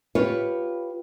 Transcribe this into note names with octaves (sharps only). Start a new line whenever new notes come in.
F4 G4 B4 C#5